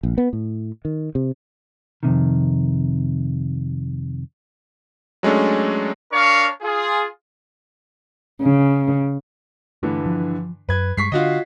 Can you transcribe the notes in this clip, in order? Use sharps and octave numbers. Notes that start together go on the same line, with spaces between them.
A#1
B3
A2
D#3
C3
F2 G#2 C3 D#3
F#3 G#3 A3 C#4 D4
D4 A#4 C#5 F5 C#6
F4 G#4
C#3
G2 D3 E3 A3
F3
F#2 B4 G#6
G2 G3 G#3 C#6 B6 C7
D3 C#4 D4 F4 F#4 D#5